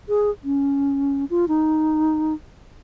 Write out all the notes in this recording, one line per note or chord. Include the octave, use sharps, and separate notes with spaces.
G#4
C#4
F4
D#4